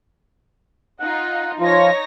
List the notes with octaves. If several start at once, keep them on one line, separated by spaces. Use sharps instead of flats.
D#4 F4 F#5
F3 D#4 F4 C#5 A#6